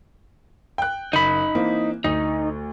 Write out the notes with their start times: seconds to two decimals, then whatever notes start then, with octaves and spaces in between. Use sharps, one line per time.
0.78 G5 F#6
1.13 F#1 D#4 B5
1.55 E3 A#3 C4
2.04 D2 D#4